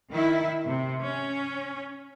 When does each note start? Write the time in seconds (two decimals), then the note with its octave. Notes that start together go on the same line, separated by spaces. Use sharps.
0.11 D#3 E4
0.66 C3
1.02 C#4